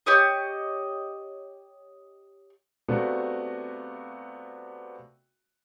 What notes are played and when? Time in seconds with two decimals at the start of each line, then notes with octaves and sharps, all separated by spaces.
0.06 G4 C#5 D#5
2.88 C3 A3 B3 D4 F4 F#4